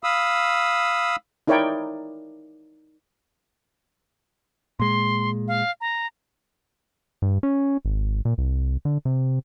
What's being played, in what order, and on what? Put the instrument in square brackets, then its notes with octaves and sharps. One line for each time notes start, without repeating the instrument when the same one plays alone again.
[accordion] F5 B5 D#6 E6
[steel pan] D#4 E4 A#4 C#5 D5 G5
[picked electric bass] A#2 G#3 [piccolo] C6
[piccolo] F5
A#5
[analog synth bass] G2
C#4
G#1
A#2
C2
D3
C3